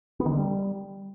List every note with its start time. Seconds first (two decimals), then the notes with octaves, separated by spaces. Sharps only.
0.20 B3
0.26 D#3
0.32 D3
0.38 G3